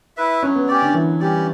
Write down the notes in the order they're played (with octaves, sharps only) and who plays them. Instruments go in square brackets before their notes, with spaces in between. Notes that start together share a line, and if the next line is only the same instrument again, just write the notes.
[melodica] E4 B4 E5
[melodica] F#3 [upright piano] C#4
[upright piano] B3
[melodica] C#4 G4 D5
[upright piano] D3
[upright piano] E3 [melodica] F#3
[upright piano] G3 [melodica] C#4 G4 D5